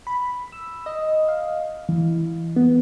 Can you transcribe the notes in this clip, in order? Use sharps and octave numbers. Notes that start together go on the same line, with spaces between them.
B5
E6
D#5
F5
E3
B3